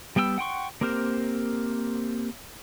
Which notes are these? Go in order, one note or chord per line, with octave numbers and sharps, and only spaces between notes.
G3 B3 G5 A5 E6
F#5 G5 C6 C#6
A#3 C4 G4 A#4 C5